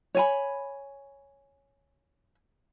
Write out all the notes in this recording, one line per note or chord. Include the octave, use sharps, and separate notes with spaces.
C#5 G#5 B5